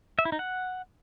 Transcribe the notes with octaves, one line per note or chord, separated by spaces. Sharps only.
E5
E4
D#4
F#5